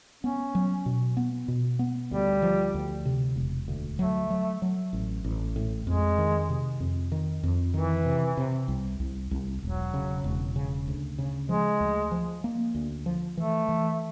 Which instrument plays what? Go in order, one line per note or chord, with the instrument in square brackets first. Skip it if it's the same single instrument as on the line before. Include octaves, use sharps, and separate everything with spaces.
[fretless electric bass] B3 [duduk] C#4
[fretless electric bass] F#3
B2
B3
B2
B3
[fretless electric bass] D2 [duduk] G3
[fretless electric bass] F3
D2
C3
E1
D2
[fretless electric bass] F#3 [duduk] A3
[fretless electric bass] F#3
F#3
A1
A1
A2
[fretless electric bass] F2 [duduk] G#3
[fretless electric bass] D#3
C3
F2
D#3
F2
[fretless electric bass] D#3 [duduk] E3
[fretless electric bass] C3
C3
C2
C2
C2
[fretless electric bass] E1 [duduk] F#3
[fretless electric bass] C#3
E1
C#3
D2
C#3
[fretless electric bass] F3 [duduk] G#3
[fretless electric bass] D2
F3
A#3
D2
F3
[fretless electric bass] E3 [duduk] A3
[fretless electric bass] E3